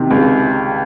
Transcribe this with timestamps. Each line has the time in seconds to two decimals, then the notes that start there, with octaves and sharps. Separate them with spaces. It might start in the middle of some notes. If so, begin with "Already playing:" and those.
Already playing: C3 D#3
0.10 C#2